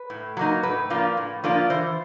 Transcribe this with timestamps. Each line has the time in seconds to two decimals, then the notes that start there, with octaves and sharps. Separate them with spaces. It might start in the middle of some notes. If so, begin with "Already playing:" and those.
Already playing: B4
0.10 A2
0.37 F#3 A#3 D#4
0.63 A2 B4
0.90 F3 A#3 D4 F4
1.17 A2
1.44 F3 A#3 D4 F4
1.70 E3 C5